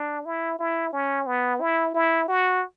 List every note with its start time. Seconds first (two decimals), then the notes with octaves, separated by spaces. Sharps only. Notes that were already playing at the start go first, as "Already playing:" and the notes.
Already playing: D4
0.25 E4
0.59 E4
0.93 C#4
1.27 B3
1.61 E4
1.94 E4
2.28 F#4